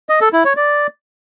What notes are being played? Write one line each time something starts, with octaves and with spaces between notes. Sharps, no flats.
D#5
A4
E4
C#5
D5